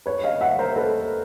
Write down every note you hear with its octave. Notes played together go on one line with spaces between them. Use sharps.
B4 C#5
D#5 F5
E5 F#5
A#4 C5
A4 B4